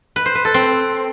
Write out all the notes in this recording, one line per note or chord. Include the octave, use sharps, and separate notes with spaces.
B4
C5
B4
A4
C4